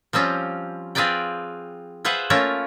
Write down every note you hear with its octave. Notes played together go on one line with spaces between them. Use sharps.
F3 G3 C4 C#4 F4
C4 F4 G#4 B4 D5 G5
F4 G#4 B4 C5 E5 F#5
A3 A#3 C#4 F4 A#4 C#5